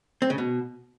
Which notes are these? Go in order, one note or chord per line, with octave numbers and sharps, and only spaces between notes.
C4
C#3
B2